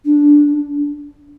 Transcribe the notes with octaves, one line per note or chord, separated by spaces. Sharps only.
D4